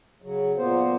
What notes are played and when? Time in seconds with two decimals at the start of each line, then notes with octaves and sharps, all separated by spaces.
0.22 C#3 F#3
0.57 A#2 A#3 B3 C5